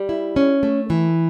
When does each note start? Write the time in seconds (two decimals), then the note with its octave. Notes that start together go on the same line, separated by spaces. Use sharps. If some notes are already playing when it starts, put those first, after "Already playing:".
Already playing: G3
0.09 E4
0.36 C#4
0.63 A3
0.90 E3